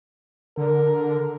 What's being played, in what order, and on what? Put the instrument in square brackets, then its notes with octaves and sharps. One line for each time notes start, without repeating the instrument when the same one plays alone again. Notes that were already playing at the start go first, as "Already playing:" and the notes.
[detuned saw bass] D3 [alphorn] A#4